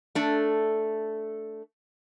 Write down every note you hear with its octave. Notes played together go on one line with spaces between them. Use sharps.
A3 D4 A4